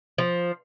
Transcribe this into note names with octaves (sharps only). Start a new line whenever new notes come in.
F3